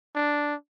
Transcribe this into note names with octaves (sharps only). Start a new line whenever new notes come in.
D4